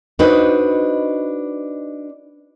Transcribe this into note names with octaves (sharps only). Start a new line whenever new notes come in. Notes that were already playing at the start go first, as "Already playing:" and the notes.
D4 D#4 F#4 B4 C5 D#5